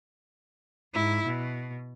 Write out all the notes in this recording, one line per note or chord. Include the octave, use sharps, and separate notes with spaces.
G#2 E4
B2